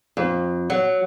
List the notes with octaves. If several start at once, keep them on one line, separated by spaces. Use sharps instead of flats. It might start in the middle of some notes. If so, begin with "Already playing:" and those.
F2
F#3